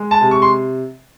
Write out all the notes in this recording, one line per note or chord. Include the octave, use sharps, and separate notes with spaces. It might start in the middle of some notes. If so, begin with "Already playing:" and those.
Already playing: G#3
A5
C3
C#6
C6